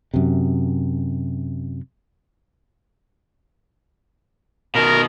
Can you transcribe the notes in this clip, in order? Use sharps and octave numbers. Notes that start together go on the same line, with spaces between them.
F#2 C3
B2 D#3 A#4